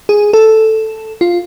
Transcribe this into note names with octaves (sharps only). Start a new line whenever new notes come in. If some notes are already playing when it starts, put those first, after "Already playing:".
G#4
A4
F4